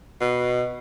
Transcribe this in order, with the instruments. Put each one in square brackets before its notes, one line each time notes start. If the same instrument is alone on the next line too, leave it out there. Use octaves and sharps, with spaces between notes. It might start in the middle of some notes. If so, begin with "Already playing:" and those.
[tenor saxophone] B2